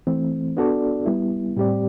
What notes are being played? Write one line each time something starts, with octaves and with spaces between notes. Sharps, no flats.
E3 A3 C4
B3 D4 F#4 A4 D5
G3 B3 E4
A2 G3 C4 G4 D5